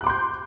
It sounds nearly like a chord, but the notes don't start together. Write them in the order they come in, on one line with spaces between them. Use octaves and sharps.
F#6 D6 C6 G6